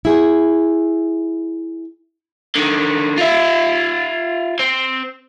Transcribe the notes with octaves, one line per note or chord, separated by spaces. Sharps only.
E4 G#4
D3 D#3
F4 E5
C4